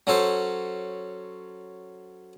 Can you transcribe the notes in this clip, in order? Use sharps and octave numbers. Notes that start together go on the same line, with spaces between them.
F#3 C#4 A4 C5